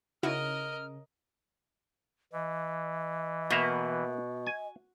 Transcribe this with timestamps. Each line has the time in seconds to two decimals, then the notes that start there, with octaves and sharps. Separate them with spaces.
0.23 C#3 D#4 E4 F#4 A#4 D#5 F6
2.33 E3 D#5
3.50 B2 A#3 E5 A#5
4.47 G#5